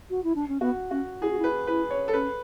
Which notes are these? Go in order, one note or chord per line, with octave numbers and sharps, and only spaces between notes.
F#4
E4
D4
C#4
B3 F#4
C#4 F#4
E4 G#4
F#4
E4
B4
E4 B4
C#5
A4
C#4 B4